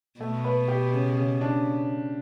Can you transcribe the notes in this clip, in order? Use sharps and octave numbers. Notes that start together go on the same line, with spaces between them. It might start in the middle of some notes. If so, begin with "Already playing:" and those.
B2 A3
B4
G4
C#3
C#3
D4